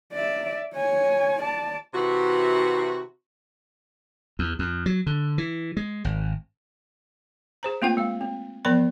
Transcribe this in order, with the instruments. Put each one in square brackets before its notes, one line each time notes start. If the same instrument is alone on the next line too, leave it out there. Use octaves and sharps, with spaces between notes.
[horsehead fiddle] D5 E5
C#5 G#5
D5 A5
[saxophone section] C3 E3 F#4
[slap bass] E2
F2
F#3
D3
E3
G#3
G#1
[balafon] G#4 C5 A#5
A3 A#3 C4 F4 F#5 G5
G#3 F5
C4
E3 F3 B3 A#4 D5 B5